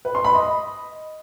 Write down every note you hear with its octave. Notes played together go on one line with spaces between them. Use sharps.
B4
C6
B5
D#5